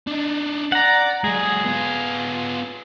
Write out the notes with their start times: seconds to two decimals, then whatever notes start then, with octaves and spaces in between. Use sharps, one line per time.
0.07 D4 D#4
0.72 D5 F#5 A#5
1.24 F#3 G#3 G#4
1.65 B3 F4